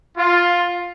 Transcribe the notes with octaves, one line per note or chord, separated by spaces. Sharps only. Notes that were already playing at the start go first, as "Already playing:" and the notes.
F4